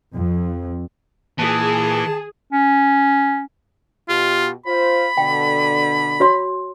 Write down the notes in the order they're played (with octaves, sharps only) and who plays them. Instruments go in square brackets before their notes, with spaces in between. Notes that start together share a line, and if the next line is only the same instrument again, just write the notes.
[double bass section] F2
[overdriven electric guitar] A#2 [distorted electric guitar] E3 [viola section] G#4 [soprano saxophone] A5
[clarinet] C#4
[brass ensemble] B2 G4 [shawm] F4
[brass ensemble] F4 C5 [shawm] B5
[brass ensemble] B2 D3 [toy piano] G5
[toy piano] F#4 C#5 C6